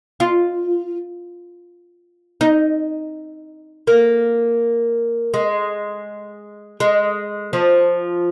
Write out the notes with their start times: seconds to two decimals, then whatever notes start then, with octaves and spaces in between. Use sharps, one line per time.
0.20 F4
2.41 D#4
3.87 A#3
5.34 G#3
6.80 G#3
7.53 F3